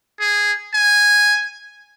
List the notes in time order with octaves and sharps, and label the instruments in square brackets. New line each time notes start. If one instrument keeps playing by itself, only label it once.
[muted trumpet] G#4
G#5